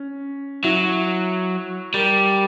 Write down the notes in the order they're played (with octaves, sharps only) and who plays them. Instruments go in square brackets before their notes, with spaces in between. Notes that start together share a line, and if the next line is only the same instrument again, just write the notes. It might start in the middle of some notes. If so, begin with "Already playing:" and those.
Already playing: [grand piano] C#4
[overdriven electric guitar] F#3 [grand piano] E4
[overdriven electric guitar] G3 [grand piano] A#4